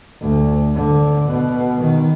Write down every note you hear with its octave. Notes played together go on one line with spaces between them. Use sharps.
D2
D3
B2
D#3